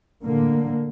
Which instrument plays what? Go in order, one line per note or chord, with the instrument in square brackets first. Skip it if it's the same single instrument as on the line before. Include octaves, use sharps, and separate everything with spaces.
[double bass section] A2 D3 A#3